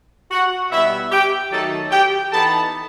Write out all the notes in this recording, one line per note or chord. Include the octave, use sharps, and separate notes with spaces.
F#4 F#5
B2 G3 B3 E4 E5
G4 G5
D#3 F#3 A3 D#4 A4 A5
G4 G5
E3 B3 D#4 A4 A5